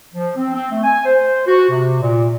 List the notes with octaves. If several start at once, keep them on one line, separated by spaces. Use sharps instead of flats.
F3
C4
C4
A3
G#5
C5
F#4
C3
A#2